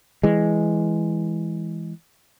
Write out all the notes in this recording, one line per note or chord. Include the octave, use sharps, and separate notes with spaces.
E3 G#3